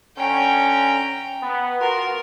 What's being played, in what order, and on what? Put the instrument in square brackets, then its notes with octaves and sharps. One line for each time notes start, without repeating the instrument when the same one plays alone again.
[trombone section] D3 C#4 [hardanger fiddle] G5 A#5
[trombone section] B3
[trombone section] B3 F4 F#4 [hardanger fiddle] A#4